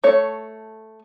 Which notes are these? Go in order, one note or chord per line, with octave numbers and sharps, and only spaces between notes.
A3 C#5